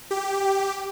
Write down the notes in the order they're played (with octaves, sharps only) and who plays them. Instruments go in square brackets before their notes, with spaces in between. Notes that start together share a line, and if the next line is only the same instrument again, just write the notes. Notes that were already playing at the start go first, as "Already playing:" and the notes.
[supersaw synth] G4